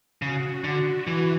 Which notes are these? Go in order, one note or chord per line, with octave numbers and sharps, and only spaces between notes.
C#3 F#4
D3
E3